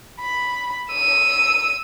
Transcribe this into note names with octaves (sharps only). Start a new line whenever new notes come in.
B5
E6 D#7